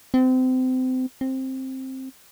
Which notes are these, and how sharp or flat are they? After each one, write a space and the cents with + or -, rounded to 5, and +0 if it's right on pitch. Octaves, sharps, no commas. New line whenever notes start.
C4 -30
C4 +10